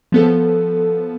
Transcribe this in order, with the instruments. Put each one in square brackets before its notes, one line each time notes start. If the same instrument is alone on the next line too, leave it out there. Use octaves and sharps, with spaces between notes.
[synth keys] F3 B3 A4